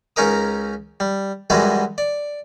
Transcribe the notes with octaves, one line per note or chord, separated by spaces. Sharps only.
C#2 C#4 D#4 A#4 D#6
G3
F#2 E3 G3 G#3 F#4 D#5
D5